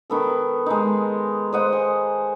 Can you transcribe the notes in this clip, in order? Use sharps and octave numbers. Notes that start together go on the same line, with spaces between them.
D#3 B3 A4
G#3 D#4
C5 D#5 F#5
G#5